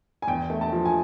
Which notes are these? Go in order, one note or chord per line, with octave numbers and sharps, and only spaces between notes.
G#5
E2 G5
A3
A5
F3
G#5